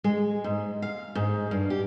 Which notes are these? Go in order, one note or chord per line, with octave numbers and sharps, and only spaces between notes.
G#3
G#2
F5
G#2
G2
G4